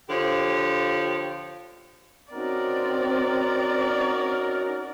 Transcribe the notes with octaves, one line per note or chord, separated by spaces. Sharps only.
D3 F3 G4 C#5
C4 C#4 D#4 F#4 A#4 D5